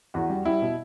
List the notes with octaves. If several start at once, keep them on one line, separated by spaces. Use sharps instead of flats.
E2 F#4
G3
G3 E4
B2